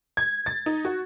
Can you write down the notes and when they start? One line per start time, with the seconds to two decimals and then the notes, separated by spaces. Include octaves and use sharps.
0.17 G#6
0.46 A6
0.66 D#4
0.85 F#4